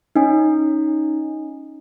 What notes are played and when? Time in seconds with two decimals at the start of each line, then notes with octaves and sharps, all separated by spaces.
0.16 C#4 D#4